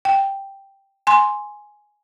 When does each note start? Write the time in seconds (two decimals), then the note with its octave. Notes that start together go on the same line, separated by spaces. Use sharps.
0.05 G5
1.07 G#5 C6